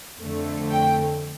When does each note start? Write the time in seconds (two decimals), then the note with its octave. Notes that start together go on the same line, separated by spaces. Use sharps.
0.22 F2 D3 A3
0.72 G5